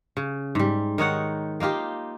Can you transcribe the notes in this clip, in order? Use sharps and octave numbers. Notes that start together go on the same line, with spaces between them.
C#3
G#2 G3
D#3 D#4 C#5 F#5
A#3 D#4 F4 G4